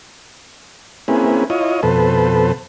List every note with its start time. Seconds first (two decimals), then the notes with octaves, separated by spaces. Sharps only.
1.08 A#3 C4 C#4 E4 G#4 B4
1.50 E4 F4 C#5 D#5
1.83 F2 B2 A4 B4 C5